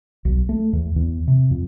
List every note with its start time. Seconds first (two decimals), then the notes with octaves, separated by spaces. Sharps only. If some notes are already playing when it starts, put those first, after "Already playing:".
0.25 B1
0.49 A3
0.73 E2
0.96 E2
1.28 C3
1.51 F2